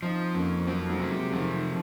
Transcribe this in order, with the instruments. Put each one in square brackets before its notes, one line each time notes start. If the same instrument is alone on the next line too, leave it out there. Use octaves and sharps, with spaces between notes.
[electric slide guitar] F3 [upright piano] C4 D#4
[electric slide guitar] F2 [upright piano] A#3 C#4
[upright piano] F#3 A#3 [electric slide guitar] C4
[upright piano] F#3 A#3
[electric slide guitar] C3
[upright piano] F3 G#3
[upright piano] D#3 F#3 [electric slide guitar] F3